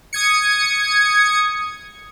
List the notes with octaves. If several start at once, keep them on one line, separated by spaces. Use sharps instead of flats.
D#6 G#6 C#7